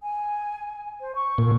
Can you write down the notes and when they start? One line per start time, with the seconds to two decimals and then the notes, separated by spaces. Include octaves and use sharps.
0.02 G#5
1.00 C5
1.15 C#6
1.38 A#2